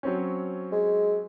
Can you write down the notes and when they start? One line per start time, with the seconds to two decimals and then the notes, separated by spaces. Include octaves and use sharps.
0.03 F#3 C4 C#4
0.72 G#3